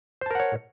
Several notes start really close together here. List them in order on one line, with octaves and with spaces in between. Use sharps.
C5 A5 A#4 F#5 C#5